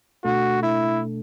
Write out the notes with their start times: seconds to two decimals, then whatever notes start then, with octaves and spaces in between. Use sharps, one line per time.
0.24 B2 A3 D4 F#4 A4
0.63 E4